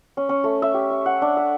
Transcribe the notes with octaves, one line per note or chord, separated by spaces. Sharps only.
C#4
C#4
A3
E5
G4
E5
F#5
D4
E5